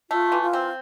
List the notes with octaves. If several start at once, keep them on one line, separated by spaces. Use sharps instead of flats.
A3 F4
E3
F4
C4